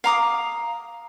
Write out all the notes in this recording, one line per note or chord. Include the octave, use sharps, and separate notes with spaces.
F5 A#5 D6 D#6